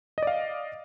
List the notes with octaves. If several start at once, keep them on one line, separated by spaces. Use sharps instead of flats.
D5 D#5 F5